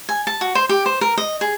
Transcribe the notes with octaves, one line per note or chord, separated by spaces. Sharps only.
G#5
A5
F#4
C5
G4
C5
A#4
D#5
G#4